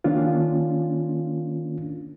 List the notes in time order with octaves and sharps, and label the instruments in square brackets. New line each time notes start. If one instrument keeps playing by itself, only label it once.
[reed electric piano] D#3 A#3 C#4 D4 F4